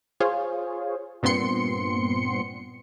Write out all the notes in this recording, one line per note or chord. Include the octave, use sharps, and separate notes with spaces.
F4 G#4 C5 C#5
G2 A#2 B3 C4 C6 C#7